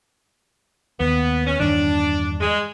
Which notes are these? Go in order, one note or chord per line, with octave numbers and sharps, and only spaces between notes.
D#2 B3
C#4
E2 G2 D#3 D4
G#3